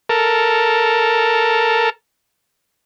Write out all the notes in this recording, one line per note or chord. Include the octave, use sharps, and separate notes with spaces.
A4 A#4